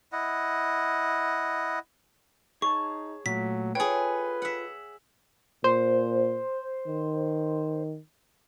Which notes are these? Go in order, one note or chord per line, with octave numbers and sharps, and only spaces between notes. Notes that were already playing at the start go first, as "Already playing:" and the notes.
E4 D#5 F#5
D#4 G#4 C#5 A5 C#6
A#2 F#3 A3 B6
F4 G#4 A4 B4 C#5 G5
E5 F#5
A#2 C5
D#3